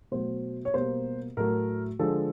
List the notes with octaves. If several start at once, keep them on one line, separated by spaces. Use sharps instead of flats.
B2 F#3 A3 C5
C#5
B2 G3 A#3 C5
A2 F#3 A3 A#4
D3 F3 G#3 A4